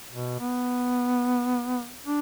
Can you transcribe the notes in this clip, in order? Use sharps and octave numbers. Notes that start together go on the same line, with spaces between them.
B2
B3
D4